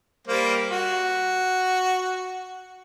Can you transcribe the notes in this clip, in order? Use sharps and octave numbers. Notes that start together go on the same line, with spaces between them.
G3 A#3 C5
F#4